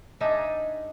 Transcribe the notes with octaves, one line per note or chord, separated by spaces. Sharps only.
D4 D#4 G#4 E5